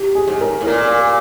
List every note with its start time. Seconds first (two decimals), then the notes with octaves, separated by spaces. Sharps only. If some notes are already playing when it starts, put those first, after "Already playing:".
Already playing: G4
0.15 G#4
0.28 G#2
0.41 A#4
0.61 A2
0.67 A#2 A#4